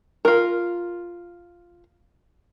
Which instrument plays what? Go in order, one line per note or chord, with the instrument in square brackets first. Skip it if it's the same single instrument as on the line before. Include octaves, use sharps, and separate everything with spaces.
[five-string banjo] F4 A#4